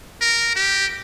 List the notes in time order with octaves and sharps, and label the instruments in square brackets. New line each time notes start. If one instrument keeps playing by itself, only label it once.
[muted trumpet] A#4
G4